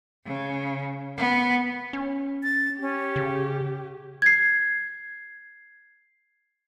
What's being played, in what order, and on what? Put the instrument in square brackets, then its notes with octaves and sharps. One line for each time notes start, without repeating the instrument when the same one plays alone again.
[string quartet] C#3
B3
[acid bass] C#4
[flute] A6
[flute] C#4 [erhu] G4
[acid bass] C#3
[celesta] G#6 C7